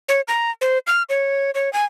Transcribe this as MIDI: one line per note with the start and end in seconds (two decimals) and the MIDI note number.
0.09 0.21 73
0.28 0.51 82
0.61 0.78 72
0.87 1.03 89
1.09 1.51 73
1.55 1.72 73
1.73 1.85 80